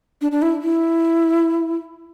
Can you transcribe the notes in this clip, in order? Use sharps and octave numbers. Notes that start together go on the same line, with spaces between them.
D4
D4
E4
E4